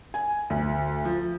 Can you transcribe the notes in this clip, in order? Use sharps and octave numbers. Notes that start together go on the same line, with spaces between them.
G#5
D2
F3